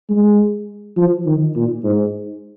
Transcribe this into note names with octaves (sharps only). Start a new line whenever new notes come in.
G#3
F3
D#3
A#2
G#2